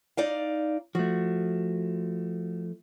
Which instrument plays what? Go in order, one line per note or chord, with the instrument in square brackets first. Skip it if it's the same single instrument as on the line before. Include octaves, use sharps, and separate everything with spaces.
[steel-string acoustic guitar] D#4 D5 F5
[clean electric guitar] F3 A3 [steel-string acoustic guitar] F#4